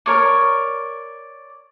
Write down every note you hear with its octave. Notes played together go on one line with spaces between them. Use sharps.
A#4 C#5 D5